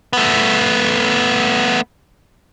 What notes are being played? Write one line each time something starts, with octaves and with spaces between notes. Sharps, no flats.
A3 B3